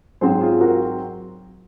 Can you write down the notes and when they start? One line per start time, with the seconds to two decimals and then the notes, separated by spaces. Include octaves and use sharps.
0.21 G#2 F#3 C4 G#4 C5
0.41 F4 G#4
0.61 F#4 A#4